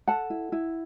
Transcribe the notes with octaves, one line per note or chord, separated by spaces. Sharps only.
A4 F#5 A5
E4
E4